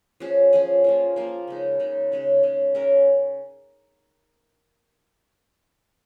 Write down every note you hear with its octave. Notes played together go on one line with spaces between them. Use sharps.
F3 C#4 G#4
F3 C#4 G#4
F3 A#3 F4
F3 A#3 F4
C#3 G#3 D#4
C#3 G#3 D#4
C#3 G#3 C#4
C#3 G#3 C#4
G#3 C#4 A#4